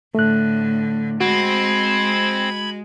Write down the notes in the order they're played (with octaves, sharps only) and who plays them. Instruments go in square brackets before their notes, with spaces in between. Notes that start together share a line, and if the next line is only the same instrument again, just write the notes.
[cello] A2 D3 [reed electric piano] A3 F#6
[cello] G#3 [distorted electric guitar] C4 [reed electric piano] F#4 [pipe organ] B5 G#6